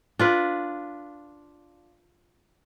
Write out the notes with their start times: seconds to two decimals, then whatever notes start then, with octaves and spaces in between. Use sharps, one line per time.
0.19 D4 F4 B4